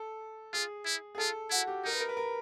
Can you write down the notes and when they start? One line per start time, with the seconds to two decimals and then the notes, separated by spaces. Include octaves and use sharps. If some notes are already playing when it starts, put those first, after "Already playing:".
Already playing: A4
0.53 F4 G#4
0.85 E4
1.15 G#4
1.18 F4 A4
1.51 E4 F#4
1.67 G4
1.85 D#4 A#4
1.92 B4
2.00 A#4
2.09 B4
2.17 A#4